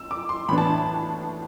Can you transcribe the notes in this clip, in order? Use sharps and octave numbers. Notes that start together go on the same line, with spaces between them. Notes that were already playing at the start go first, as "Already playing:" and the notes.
Already playing: F#2 E6
D6
C6
A2 E3 B3 D4 B5
A5